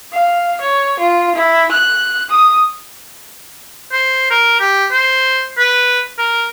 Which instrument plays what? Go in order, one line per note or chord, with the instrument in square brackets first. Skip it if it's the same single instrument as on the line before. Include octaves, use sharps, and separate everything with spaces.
[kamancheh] F5
C#5
F4
E4
F#6
D#6
[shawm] C5
A#4
G4
C5
B4
A#4